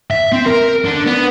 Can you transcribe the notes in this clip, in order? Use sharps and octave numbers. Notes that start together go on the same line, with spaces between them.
E5
C4
A#4
D3
B3